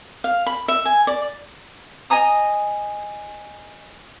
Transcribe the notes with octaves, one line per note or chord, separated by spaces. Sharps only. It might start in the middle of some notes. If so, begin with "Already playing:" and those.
F5
B5
E5
G#5
D5
D#5 G#5 A#5 D#6